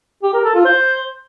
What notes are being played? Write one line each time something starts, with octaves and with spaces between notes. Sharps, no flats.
G4
A#4
A4
F4
C5